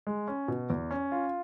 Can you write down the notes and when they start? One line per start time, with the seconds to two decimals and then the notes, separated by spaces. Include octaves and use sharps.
0.07 G#3
0.28 C#4
0.48 B2
0.70 E2
0.91 C#4
1.12 F4